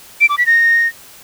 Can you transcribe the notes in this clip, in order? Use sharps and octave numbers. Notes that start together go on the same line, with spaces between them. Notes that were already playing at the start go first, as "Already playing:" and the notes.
D7
D6
B6
A#6